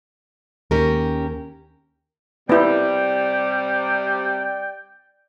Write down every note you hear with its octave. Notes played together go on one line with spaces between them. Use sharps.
D#2 C#4 G4 A#4
C3 G3 B3 E4 D5 G5